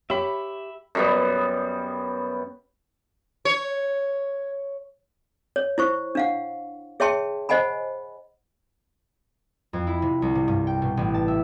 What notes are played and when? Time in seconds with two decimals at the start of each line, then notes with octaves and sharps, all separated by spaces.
0.10 G4 C#5 E5 B5
0.95 F#2 G3 B3
3.45 C#5
5.56 C#5
5.78 E4 C5 C#6
6.15 D4 F5 F#5
7.00 G#4 C#5 E5 G5 A5 C6
7.49 C5 D#5 F#5 G#5 B5
9.73 F2
9.87 E4
10.02 C3
10.22 C2
10.35 C3
10.48 G2
10.67 G5
10.82 B2
10.97 A1
11.14 A5
11.28 E5